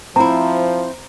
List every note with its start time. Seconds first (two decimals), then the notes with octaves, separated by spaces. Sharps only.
0.16 F3 C4 E4 C5 A#5